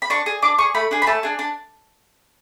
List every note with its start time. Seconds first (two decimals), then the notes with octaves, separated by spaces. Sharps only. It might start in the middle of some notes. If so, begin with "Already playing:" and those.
0.02 B5
0.10 D4 C#6
0.26 G#4
0.42 D4 D6
0.58 G#4 C#6
0.75 A3 B5
0.91 D4 G#4
1.02 B5
1.07 A3 A5
1.23 D4 G#4
1.39 D4